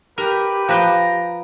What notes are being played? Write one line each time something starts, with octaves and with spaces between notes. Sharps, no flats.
G4 A#4 B4
F3 B4 G5 A#5